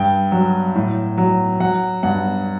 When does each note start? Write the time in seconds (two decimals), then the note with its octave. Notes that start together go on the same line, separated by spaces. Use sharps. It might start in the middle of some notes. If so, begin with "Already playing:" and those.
Already playing: G2 G5
0.32 F#3
0.75 A2
1.18 F#3
1.60 F#3 F#5
2.03 G2 F#5